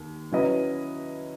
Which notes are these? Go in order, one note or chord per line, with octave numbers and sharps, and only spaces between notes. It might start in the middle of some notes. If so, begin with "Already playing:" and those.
Already playing: D#2
F#3 C#4 E4 B4 D#5